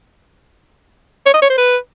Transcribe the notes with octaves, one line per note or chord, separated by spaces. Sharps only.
C#5
D#5
C#5
C5
B4